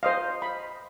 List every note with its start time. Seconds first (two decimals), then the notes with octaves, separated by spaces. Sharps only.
0.03 C5 D#5 F5
0.42 B5